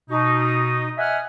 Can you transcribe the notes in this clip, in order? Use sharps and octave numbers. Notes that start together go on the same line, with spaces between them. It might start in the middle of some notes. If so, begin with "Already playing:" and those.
B2 D#4
D#5 E5 F#5 G#5 F6